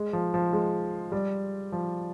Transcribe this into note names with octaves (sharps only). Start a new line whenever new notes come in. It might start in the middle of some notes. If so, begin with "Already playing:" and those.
Already playing: G#3
F3
F3
G#3
G3
F3